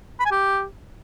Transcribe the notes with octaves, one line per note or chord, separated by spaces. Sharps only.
B5
G#5
G4